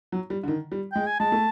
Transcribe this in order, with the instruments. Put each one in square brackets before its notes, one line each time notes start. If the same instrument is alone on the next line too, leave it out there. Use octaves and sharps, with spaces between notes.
[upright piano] F#3
G3
D3
D#3
G3
[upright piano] G#3 [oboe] G5
[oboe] G#5
[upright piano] G#3 [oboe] A5
[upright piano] A3